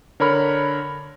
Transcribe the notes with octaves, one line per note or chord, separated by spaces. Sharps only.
D3 A#4 C#5 B5 F6